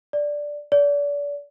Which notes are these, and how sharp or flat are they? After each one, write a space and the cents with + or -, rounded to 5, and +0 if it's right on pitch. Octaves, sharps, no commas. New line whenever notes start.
D5 +0
D5 -35